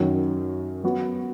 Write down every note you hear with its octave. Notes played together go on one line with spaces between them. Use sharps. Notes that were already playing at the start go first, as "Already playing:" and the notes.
Already playing: F#2 D#3 F#3
F#3 B3 F#4